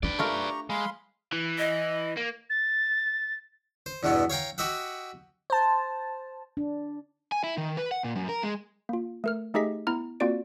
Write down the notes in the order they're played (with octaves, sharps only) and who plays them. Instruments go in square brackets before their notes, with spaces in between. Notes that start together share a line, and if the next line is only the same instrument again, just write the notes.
[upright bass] D4 [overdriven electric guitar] B4 D5
[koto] A3 F4 A#4 [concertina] G4 A#5 C#6
[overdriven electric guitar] G#3 [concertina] F5 B5 C6
[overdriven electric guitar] E3
[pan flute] D#5
[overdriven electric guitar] A#3
[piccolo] A6
[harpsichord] C5
E2 G2 B2 E3 B3
C#5 F5 G5 A#5
F#4 G4 D#5 E5 F#5
[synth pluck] C5 A5
[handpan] D4
[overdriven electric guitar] G#5
E4
D#3
B4
F#5
A#2
F#2
A#4
G#3
[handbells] A#3 F4
A3 A#4 F6
A3 D#4 G4 G#4 D#5 B6
B3 E4 A#5 F6
A#3 C4 F4 F#4 D5 D7